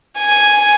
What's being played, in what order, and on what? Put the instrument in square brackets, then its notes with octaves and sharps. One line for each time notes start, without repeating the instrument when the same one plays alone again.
[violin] G#5